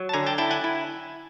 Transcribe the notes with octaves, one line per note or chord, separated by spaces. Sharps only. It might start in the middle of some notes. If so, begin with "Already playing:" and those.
Already playing: F#3
A5
D3 G#5 A#5
G5 A5
E4 G5 A5
F#5 G#5
E4